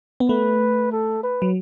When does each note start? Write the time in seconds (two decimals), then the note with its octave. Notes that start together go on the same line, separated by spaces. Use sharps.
0.20 B3
0.29 A3 B4
0.92 A4
1.23 B4
1.42 F#3